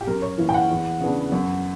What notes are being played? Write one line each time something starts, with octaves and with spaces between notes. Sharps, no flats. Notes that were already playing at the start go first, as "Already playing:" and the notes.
G4
F#2 A#4
C#5
E3 A#3
G5
F#5
E2
C#3 E3 B3 D4
F#2